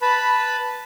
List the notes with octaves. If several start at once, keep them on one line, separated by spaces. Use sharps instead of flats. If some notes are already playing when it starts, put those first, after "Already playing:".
B4 A5 B5